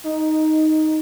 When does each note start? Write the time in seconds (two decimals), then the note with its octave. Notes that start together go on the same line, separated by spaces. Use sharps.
0.04 D#4